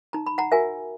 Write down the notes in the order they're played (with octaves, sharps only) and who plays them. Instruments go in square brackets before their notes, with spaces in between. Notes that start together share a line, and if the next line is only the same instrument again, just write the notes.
[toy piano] D#4 A#5
B5
F#5 A#5
F#4 A#4 E5 G#5